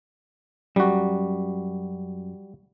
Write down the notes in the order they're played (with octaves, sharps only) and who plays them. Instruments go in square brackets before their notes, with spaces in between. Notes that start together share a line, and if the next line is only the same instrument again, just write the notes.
[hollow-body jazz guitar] F#2 [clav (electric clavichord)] G3 F#4